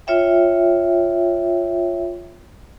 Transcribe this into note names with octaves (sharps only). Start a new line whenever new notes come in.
F4 C#5 E5 G5